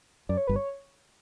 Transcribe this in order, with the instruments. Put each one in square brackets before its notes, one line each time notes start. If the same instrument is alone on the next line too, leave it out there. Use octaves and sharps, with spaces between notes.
[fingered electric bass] F#2 [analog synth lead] D5
[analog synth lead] C#5
[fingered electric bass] G1 G2 [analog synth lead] B4
[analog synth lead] C#5